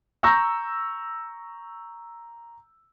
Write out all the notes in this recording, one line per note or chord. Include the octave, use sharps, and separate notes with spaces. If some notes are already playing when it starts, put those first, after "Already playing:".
A#5 C#6 E6 G6 A#6